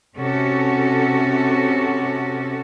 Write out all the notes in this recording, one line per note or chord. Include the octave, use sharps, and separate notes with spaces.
C3 C#4 F#4 A4